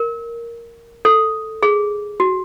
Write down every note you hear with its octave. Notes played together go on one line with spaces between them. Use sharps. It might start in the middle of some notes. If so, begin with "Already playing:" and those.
Already playing: A#4
A4
G#4
F#4